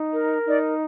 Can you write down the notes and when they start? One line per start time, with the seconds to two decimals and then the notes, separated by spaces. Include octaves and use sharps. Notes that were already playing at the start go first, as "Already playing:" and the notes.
Already playing: D#4
0.13 A#4
0.46 D#4 D5